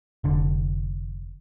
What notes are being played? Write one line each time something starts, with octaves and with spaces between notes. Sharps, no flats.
F1 D3